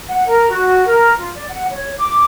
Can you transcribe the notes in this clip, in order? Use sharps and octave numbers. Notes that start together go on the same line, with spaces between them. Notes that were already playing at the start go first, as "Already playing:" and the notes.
F#5
A#4
F#4
A#4
F4
D5
F#5
C#5
D6